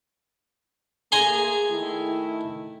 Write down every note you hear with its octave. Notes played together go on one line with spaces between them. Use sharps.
A3 A#3 G#4 G#5 A#5 C6
D#3 A3 E4